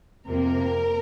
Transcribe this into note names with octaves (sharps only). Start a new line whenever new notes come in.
F2 C3 F3 A#3 A#4